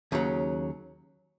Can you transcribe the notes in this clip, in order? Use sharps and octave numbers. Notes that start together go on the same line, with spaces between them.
D#2 C#3 F#3